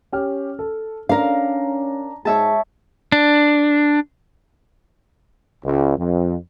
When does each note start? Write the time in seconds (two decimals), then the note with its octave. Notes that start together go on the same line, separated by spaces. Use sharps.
0.12 C#4 G4 F6
0.59 A4
1.09 C#4 D4 A#4 F5 A#5 A#6
2.25 G#2 G#3 C#5 E5 A5
3.12 D4
5.64 C#2
5.97 F2